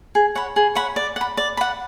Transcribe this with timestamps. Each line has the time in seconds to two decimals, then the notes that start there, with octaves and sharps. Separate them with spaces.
0.15 G#4
0.35 C#5 F#5 B5
0.56 G#4
0.75 C#5 F#5 B5
0.96 D5
1.16 F#5 B5
1.37 D5
1.57 F#5 B5